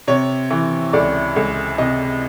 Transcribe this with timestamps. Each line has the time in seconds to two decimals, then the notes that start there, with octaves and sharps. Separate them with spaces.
0.08 C3 C#5
0.51 E3
0.93 C#2 D5
1.36 C#2
1.78 C3 D#5